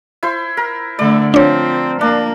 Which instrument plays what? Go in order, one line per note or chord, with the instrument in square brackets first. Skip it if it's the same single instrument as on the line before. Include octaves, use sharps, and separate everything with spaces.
[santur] E4 C5
A#4
[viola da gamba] D3 A3 [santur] D5
[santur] F3 [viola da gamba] C4 [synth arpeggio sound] D4 C#5
[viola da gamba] A#3 [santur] D4